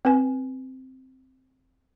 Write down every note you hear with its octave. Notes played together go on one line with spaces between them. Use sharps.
C4 B4 G#5